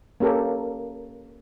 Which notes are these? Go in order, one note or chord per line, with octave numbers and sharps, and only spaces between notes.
A#3 C#4 G4 A4 A#4